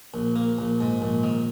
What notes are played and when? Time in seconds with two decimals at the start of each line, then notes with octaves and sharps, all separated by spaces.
0.14 A#1
0.36 A#3
0.59 A#1
0.80 G#2
1.02 A#1
1.23 D#3